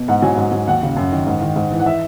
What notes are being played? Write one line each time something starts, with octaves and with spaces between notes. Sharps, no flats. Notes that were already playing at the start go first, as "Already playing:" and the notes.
Already playing: B2
G#2 F#5
F#3 G#5
G#2
F#3
D#2 F#5
C#3
F#2
D#3
G#2
D#3
G#2
E3
F#5
E5